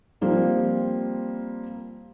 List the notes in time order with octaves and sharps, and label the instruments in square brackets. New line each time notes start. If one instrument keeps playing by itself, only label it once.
[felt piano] F3 G3 A#3 C4